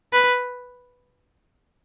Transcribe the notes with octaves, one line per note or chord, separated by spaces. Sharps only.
B4